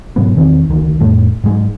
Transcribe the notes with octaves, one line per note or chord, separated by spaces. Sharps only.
G#2 B2 F#3 B3
E1 D#3 C4
C#2 D3 D#3
F2 A2 A3
G#2 F#3 G#3